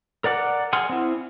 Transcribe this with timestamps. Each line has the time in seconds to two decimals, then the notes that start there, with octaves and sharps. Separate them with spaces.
0.24 A#4 D5 F#5 D6
0.73 G#4 F#5 C6 F6
0.89 C4 E4